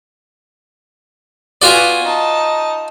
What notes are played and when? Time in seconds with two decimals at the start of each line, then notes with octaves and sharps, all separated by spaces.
1.62 B3 F4 F#4 D5 G#5
2.03 D#4 A5